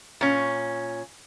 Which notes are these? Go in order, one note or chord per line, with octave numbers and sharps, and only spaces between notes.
A#2 C#4